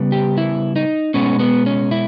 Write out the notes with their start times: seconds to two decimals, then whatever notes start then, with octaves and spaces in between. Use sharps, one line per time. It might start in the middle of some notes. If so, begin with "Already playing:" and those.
Already playing: C#3 G3 B3
0.12 G4
0.38 E4
0.76 D#4
1.14 B2 G#3 B3 C#4
1.39 B3
1.66 C#4
1.91 E4